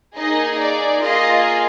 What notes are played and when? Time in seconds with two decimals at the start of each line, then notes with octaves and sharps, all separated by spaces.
0.16 A#3 D#4 G#4 D#5
0.59 D5
1.02 A#3 F4 G#4 D#5